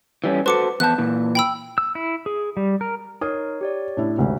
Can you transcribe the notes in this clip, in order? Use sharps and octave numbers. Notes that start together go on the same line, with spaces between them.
E3 G3 C#4
F#4 A4 B4 C5 D6 C#7
E2 B3 A5 F#6 G6
A#2 E3
G5 B5 E6
E6
E4
G#4
G3
A#4
D#4 A#4 C#5 D#6
G4 C#5 D5
A2 D4 E4
G#1 D2 C3